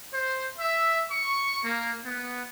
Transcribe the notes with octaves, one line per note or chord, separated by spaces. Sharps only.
C5
E5
C#6
A#3
B3